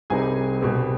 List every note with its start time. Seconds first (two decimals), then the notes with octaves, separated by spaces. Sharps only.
0.10 C2 C3 G3 C4 D#4 G#4 G#5
0.62 C2 B2 G3 C4